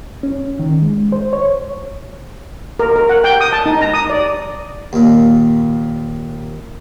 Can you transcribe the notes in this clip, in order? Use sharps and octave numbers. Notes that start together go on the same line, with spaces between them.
C#4
D#3
G#3
C5
C#5
A#4
A#4
F#5
G5
D#6
A5
D#4
A#5
D#6
D5
D#2 A#2